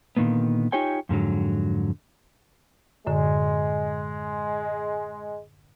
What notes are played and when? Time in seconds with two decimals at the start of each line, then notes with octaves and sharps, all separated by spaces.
0.17 A#2 D3 D#3 A#3 B3
0.72 D#4 F4 G4 C#5 G5 G#5
1.09 F2 G#2 D3 F#3
3.07 F#2 A2 D3 G#3